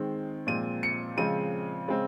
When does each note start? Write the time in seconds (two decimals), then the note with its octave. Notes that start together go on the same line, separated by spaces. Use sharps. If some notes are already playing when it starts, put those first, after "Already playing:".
Already playing: D#3 G#3 C4
0.47 A#2 F3 G#3 C4 D#7
0.83 C#7
1.17 C#3 F3 G#3 C4 D#7
1.88 C#3 G#3 C4